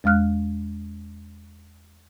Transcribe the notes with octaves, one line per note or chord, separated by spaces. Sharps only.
E2 G#3 F5 F6 F#6